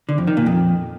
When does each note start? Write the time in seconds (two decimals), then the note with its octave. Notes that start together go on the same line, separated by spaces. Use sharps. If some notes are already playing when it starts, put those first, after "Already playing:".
0.09 D3
0.18 F2
0.27 D#3
0.37 A#2
0.46 F2